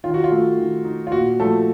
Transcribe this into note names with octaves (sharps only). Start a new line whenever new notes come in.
D#3 F4
F#4
F4
A3
D#3
D#4
F4
A#2 F#4
F3 A3 A4